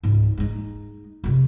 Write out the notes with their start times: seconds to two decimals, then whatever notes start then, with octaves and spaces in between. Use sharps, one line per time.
0.03 C#2 G#2
0.38 G#3 D#4
1.24 F2 C3